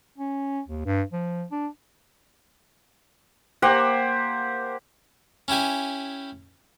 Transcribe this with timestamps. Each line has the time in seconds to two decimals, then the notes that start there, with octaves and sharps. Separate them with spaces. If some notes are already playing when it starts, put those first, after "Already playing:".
0.18 C#4
0.68 D#2
0.86 G2
1.13 F3
1.51 D4
3.62 A#3 G4 C5 F#5
5.48 C#4 E4 G4 G#5